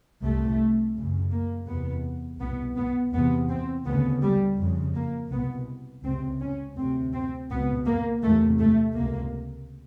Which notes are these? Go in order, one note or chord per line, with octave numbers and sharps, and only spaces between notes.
C2 C3 A3
F#2 C#3
A#3
E2 C3 B3
C2 B2 B3
B3
E2 C3 B3
C4
D2 C#3 B3
G3
F2 C#3
A#3
C2 B2 B3
C#2 C3 C4
C#4
D2 C3 C4
C4
C#2 B2 B3
A#3
E2 C3 A3
A3
C#2 C3 A#3